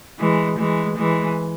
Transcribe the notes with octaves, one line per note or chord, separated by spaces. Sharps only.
E3 G#3
E3 G#3
E3 G#3